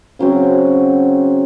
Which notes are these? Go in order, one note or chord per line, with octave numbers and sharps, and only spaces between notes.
C#3 F#3 C4 F#4